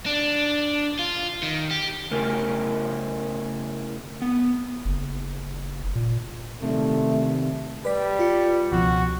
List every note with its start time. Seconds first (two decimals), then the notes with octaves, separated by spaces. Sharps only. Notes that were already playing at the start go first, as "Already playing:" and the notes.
0.06 D4
0.99 F4
1.43 D#3
1.71 G4
2.11 C#3 A3 C#4 E4 A#4
4.22 B3
4.85 F#1
5.95 A#2
6.62 C3 D#3 G3 A3
7.85 G3 B4 D5 B6
8.19 F4 C#7
8.72 C#2 B2 F3 F#4